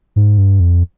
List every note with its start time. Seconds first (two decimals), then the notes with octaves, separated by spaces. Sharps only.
0.16 G#2
0.38 G2
0.60 F2